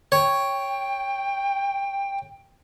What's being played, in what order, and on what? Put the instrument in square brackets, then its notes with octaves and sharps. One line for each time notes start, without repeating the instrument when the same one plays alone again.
[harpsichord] C#5 [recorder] G5